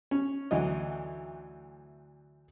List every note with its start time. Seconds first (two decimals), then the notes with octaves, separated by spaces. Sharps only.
0.11 C#4
0.51 D2 E3 F#3 D#5